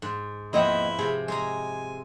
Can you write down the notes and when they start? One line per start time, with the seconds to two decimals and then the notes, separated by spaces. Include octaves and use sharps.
0.02 G#2
0.53 D#2 F3 B3 C4 E4 D#5
0.99 C3 G#4
1.28 G#3 G#5 A#5